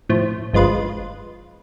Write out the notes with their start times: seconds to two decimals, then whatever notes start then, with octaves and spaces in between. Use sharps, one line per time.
0.09 A2 F3
0.53 G1 F3 G#3 F4 B4